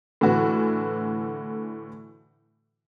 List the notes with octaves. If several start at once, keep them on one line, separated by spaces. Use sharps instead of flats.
A2 D3 E3 F#4